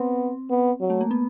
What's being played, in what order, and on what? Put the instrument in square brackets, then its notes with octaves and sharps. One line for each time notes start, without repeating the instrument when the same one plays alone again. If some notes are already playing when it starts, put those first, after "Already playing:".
Already playing: [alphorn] B3 [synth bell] C4
[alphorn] B3
F#3
[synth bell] A3
A#3
B3